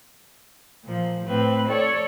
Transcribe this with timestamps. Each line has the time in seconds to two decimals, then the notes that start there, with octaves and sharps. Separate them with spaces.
0.84 A#2 F3
1.24 A2 C4 B4
1.69 A4 C#5 D5